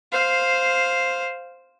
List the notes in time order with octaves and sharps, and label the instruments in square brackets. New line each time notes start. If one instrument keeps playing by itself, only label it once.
[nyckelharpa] C5 F5